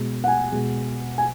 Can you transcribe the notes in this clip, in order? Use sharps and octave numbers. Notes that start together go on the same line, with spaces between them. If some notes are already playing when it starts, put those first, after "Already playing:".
Already playing: B2 G#3
F#5
G#5
B2 G#3
G#5